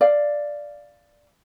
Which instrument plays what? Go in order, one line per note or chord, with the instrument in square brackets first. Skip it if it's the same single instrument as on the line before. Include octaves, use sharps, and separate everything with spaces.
[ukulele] D5 F5